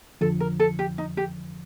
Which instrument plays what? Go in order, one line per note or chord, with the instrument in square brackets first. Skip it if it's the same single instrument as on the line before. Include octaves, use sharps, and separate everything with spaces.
[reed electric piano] F2 D3 F3 [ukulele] A4
[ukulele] A#4
A4
G4
D#4
G4